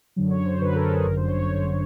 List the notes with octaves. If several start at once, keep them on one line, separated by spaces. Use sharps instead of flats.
F#2 D3 F#3
C#5
C5
F#2 D3 F#3 B4
A#4
A4
G#4
G1 F#2 D3 A#4
C5
C#5
C#5
G1 F#2 D3 C5